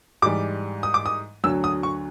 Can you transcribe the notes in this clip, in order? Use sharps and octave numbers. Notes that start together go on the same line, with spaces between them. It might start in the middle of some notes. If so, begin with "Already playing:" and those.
G#2 E3 G3 D6
D#6
D6
D#6
D2 D3 F#3 E6
D#6
C#6